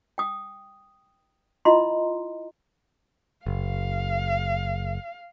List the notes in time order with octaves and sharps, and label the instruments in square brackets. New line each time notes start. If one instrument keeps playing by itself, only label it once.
[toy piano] G5 D#6
E4 F4 D#5 A#5 C6
[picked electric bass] F#1 [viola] F5